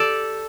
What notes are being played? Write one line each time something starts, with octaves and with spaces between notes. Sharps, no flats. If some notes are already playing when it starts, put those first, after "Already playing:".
Already playing: G4 A4 D5